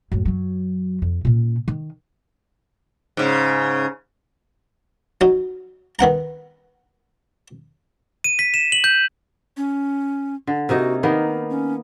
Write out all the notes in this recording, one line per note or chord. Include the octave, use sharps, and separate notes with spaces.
F#2 A2
F#2 F#3
F2
A#2 C#4
D#3
G#2 C#3
F#3 D#4
D#3 B3 F#5 A#5
D#7
B6
E7
F#7
G6
C#4
D3
C3 A#3 D#4 F#4
D#3 A#3 B3 D#4
C#4